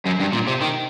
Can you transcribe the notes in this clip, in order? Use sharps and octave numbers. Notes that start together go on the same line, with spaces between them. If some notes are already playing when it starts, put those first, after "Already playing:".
F#2
G2
A#2
C3
D#3